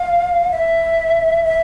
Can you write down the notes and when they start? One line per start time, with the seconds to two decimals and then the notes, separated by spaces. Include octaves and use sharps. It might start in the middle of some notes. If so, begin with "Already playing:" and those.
Already playing: F5
0.51 E5
1.44 E5